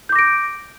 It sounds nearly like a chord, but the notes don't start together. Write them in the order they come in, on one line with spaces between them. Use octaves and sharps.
G6 D6 A#6 D7